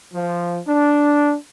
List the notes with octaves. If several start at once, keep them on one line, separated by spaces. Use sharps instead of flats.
F3
D4